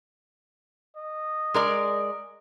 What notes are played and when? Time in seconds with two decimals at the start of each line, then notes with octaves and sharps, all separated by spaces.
0.96 D#5
1.54 G#3 A#4 D5